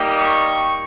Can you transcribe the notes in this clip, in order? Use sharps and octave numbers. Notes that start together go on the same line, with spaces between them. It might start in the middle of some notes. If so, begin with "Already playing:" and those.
Already playing: G3 A#3 D#4 G4
C#6